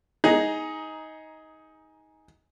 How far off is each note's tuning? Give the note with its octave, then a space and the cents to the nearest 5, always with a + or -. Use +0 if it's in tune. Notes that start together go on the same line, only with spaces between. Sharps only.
D#4 +15 G#4 +0 A#5 +10